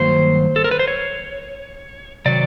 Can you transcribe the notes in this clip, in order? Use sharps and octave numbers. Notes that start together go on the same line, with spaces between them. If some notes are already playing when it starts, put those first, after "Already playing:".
Already playing: G2 D#3 F#3 A#3 C5
A4
A#4
B4
C5
C#5
C3 D#3 F#3 D5